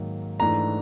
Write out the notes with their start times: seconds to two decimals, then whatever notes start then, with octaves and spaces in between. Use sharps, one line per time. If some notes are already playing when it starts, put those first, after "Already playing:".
Already playing: G#2 D#3 F#3 A#3
0.39 G#2 E3 A3 D4 A#5